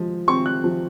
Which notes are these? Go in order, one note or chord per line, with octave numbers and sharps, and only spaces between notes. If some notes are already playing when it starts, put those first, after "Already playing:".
Already playing: F3 G#3
C4 C#6
F#6
F3